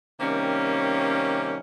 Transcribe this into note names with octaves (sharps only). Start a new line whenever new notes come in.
C3 D#3 G3 A#3 C#4